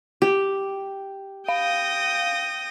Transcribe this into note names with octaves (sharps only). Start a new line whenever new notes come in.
G4
F5 G5 D#6 A#6